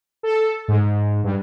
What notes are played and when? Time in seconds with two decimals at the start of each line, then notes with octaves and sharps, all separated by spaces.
0.23 A4
0.68 G#2
1.24 G2